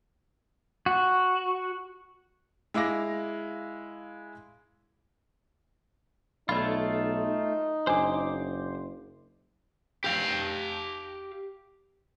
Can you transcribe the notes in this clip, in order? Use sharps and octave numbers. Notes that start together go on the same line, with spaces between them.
F#4
G#3 E4 F5 D6 A#6
B1 A3 D#4 F4 D5 B5
F#1 D4 C5 D6
G4 F5